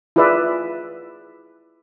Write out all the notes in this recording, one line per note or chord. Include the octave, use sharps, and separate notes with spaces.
E4 F4 G#4 B4 D5 E5